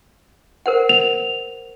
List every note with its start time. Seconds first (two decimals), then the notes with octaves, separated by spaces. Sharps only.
0.66 A#4 C5 F#5
0.89 F7